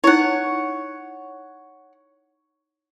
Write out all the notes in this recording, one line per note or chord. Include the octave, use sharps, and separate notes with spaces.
D#4 E4 C#5 F#5